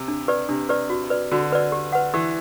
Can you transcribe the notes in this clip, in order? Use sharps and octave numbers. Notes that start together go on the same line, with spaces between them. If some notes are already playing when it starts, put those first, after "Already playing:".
Already playing: C3
D4
G4 B4 D5
C3 D4
G4 B4 D5
F#4
B4 D5
D3 F#4
B4 D5
G4
B4 F#5
E3 G4